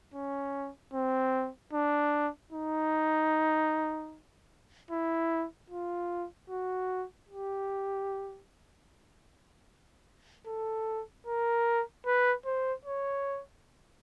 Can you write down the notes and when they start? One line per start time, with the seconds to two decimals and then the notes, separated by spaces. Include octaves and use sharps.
0.14 C#4
0.94 C4
1.73 D4
2.52 D#4
4.91 E4
5.70 F4
6.50 F#4
7.29 G4
10.47 A4
11.27 A#4
12.06 B4
12.46 C5
12.85 C#5